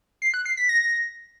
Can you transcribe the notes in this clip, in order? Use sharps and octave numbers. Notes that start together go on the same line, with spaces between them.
C7
F#6
C7
B6
A#6